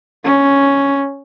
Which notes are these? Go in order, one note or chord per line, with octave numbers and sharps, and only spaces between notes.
C#4